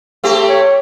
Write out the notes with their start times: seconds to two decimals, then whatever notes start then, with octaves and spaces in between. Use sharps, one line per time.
0.24 A3 C4 G4
0.49 C#5